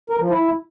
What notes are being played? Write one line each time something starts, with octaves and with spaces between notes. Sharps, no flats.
A#4
F3
E4